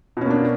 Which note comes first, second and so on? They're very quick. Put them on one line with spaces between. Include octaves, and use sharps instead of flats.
B2 C#4 A#3 D4